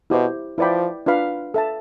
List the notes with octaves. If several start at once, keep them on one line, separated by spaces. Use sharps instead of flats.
B2 E4 G4 C5
F3 E4 B4 D5 G5 B5
D4 F4 B4 F5 B5
A4 E5 A5